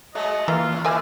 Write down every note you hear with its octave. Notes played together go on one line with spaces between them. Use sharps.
F#3 G#3 A3 D#5
E3 A#3 F4 A#5
F#2 D#3
E3 E4 A#4 D#5 G#5